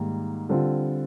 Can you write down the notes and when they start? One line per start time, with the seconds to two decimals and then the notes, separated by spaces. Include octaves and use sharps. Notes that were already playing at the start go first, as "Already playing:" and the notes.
Already playing: G#2 D#3 G3 A#3
0.49 D3 G3 C4 F4